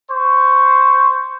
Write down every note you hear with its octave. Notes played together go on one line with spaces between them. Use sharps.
C5 C#6